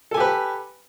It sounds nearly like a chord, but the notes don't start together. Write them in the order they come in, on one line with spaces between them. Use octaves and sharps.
A4 G#5 G4 B4